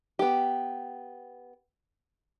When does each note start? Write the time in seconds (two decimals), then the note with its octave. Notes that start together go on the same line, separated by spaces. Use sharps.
0.19 B3 G4